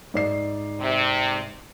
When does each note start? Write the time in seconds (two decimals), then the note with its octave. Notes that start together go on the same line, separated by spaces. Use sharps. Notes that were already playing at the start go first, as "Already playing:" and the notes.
0.14 G#2 D5 C7
0.80 C3